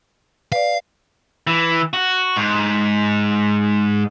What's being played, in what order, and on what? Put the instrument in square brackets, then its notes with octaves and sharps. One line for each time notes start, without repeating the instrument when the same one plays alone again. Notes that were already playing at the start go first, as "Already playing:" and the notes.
[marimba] B4 D5 [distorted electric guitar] F5
[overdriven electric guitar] E3
F#4
G#2